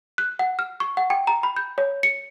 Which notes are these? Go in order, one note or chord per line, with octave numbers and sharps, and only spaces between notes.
F#6
F#5
F6
C#6
F#5
G5
A#5
B5
G6
C#5
C#7